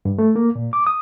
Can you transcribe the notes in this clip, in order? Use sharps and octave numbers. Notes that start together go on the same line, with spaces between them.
G2
A3
A#3
A#2
D6
D#6